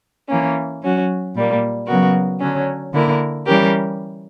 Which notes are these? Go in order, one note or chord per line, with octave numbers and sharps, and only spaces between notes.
E3 A#3 C#4
F#3 C#4 F#4
A#2 G3 A#3
C#3 F#3 B3 F#4 A#4
D3 F#3 C#4
D3 A#3 E4 A#4
E3 G3 C#4 G4 A#4